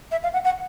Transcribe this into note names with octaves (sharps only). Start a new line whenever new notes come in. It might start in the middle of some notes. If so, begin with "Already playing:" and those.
E5
F5
F#5
F#5